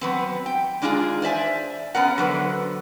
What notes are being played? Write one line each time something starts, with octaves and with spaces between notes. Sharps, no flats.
F#3 B3 C4
G5
G#3 D4 D#4 F4 G4 G#4
C5 D5 E5 G#5
B3 C#4 A#4 F#5
D3 F#3 B4 C5